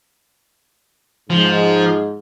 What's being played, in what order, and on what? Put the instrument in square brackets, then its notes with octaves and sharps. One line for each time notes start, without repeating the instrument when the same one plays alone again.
[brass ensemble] G#2 [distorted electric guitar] F3